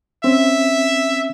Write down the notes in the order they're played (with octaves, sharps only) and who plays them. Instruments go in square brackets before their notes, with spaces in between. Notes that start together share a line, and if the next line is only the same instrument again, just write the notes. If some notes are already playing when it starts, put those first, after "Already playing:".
[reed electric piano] C4 C#4 [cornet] E5